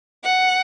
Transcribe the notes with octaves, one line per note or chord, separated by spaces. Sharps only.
F#5